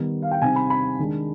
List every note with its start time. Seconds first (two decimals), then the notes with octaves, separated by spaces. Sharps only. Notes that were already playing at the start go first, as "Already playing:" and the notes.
Already playing: D#3 G3 B3 D#4
0.22 F5
0.31 G5
0.41 C3 G3 C4 D#4 G#5
0.56 B5
0.70 B5
0.99 D#3 G#3 D4